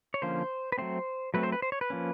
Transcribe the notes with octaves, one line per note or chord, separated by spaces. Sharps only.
C#5
D3 F3 A#3 C#4 C5
B4
F#3 A3 C4 C5
F#3 A3 C4 B4
C5
B4
C5
C#5
B4
F3 A#3 C#4